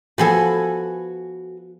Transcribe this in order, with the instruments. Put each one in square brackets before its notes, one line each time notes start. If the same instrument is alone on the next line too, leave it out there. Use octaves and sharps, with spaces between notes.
[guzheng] F3 B3 A4 [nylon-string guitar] F#4 B4 G#5